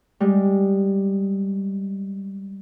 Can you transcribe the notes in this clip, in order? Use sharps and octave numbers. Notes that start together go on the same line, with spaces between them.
G3 G#3